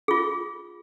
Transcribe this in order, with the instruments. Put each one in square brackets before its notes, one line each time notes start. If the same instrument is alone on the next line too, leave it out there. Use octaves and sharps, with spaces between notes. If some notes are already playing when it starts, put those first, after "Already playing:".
[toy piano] F4 G#4